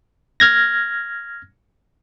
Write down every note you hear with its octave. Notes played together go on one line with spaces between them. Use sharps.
F6 G#6 A#6